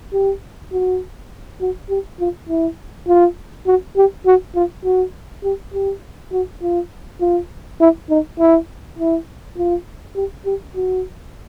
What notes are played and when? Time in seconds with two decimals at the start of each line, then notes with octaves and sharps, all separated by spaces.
0.13 G4
0.72 F#4
1.61 F#4
1.89 G4
2.20 F4
2.49 E4
3.08 F4
3.67 F#4
3.96 G4
4.26 F#4
4.55 F4
4.85 F#4
5.44 G4
5.74 G4
6.32 F#4
6.62 F4
7.21 F4
7.80 E4
8.10 D#4
8.39 E4
8.99 E4
9.57 F4
10.16 G4
10.46 G4
10.75 F#4